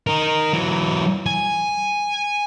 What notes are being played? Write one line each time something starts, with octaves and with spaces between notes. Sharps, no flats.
D#4 A#4
E3 F#3
G#5